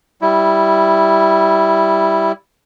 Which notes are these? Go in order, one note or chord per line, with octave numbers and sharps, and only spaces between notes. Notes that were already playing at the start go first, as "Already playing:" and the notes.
G3 E4